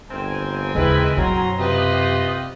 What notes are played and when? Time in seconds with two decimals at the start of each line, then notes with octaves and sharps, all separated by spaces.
0.10 G1 C4 A#4 G#5
0.75 D#2 C#3 G#3 E4 B4
1.17 F#2 B2 F#3 A#5 C6
1.59 C3 F4 G4 B4 D#5